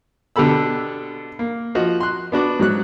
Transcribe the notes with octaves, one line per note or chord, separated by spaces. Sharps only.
B2 D3 G4 A4 B5 E6
A#3
F3 F#4 D#5
C6 F#6
B3 D4 F#4 D6
G#2 F#3 F#6